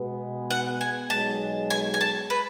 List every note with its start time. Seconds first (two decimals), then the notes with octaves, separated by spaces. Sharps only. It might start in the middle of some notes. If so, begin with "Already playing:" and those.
Already playing: B2 G#3 B3
0.51 F#5
0.81 G#5
1.10 B1 B2 G#3 A5
1.70 G#5
1.94 G#5
2.01 A5
2.30 B4